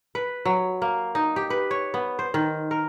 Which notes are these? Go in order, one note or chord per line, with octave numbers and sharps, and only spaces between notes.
B4
F#3
A#3
D#4
G4
B4
C#5
B3
C5
D#3
A#4